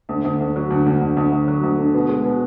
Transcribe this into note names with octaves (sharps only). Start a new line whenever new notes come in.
D2
D2
D2
F#3
D2
D2
D2
D2
D2
F#3
D2
D3
B2
G#3
B2